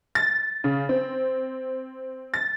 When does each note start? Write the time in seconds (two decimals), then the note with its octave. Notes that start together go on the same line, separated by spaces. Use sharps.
0.15 A6
0.64 C#3
0.89 C4
2.34 A6